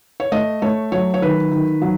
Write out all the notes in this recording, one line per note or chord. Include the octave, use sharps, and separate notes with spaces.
C#5
A3 D#5
A3 C#5
F#3 C#5
C#5
D#3 B4
D#3
F#3